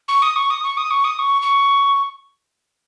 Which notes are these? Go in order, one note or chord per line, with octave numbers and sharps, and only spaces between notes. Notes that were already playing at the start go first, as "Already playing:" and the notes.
C#6
D#6
C#6
D#6
C#6
D#6
C#6
D#6
C#6
C#6